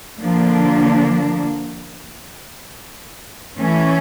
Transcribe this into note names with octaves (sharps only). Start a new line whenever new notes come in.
D3 F3 A#3 D4
E3 A3 C#4